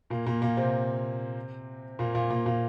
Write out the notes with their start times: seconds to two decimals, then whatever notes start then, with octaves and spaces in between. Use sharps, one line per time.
0.10 A#2 A#3
0.26 A#2 A#3
0.42 A#2 A#3
0.57 C3 C4
1.99 A#2 A#3
2.14 A#2 A#3
2.30 A#2 A#3
2.46 A#2 A#3